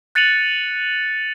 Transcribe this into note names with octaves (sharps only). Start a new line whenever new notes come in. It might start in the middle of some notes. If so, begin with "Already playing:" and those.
F#6 A6 C#7 D#7 F7 F#7